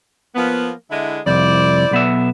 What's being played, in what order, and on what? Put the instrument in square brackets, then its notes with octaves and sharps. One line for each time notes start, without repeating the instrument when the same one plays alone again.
[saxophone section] F3 A#3 B3
D3 G#3 E4
[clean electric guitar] C2 F2 [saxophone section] E4 C5 D5
[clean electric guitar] B1 B3 E5